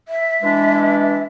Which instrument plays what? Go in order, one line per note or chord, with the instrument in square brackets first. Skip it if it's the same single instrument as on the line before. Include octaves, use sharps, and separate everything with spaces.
[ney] E5
[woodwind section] E3 G#3 D4